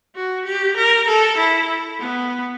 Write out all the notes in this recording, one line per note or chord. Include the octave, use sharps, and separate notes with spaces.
F#4
G4
A#4
A4
E4
B3